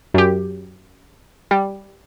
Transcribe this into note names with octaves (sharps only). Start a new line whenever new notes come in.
F#2 G4
G3